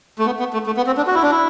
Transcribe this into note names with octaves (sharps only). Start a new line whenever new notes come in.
A3
B3
B3
A3
A3
B3
C4
D4
F#4
E4
D4
E4